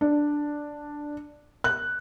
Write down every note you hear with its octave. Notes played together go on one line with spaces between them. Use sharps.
D4
F#6